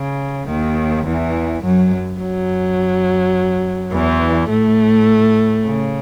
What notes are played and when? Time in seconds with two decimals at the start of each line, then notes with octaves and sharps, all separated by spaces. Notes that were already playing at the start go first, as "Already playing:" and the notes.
Already playing: C#3
0.48 D#2 D#3
1.05 E2 E3
1.63 F#2 F#3
2.20 F#2 F#3
3.92 E2 E3
4.50 A2 A3
5.65 C#3